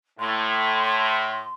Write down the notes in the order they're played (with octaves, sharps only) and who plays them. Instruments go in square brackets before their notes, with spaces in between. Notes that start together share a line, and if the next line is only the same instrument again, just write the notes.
[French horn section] A2 [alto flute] C6